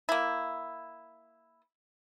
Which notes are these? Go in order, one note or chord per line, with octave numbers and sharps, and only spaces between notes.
A#3 E4